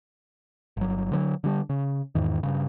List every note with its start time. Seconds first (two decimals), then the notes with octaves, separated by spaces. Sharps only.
0.77 G1 F#3
1.12 D3 E3 F#3
1.44 D3 G3 D4
1.69 C#3
2.15 E2 G#2 D#3
2.43 G2 C#3